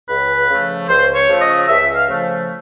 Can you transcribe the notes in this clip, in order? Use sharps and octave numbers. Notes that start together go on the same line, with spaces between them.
C#2 B4
C#3 F3 A3
C#2 C5
C#5
C#3 F3 A3
D#5
C#2 E5
F5
C#3 F3 A3